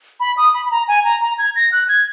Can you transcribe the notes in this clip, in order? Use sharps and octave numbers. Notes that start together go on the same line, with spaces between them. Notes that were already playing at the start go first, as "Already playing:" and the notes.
B5
D#6
B5
B5
A#5
G#5
A#5
A#5
G#6
A#6
F#6
G#6